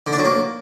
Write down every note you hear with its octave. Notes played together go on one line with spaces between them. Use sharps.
D3
D4
F#3
A#3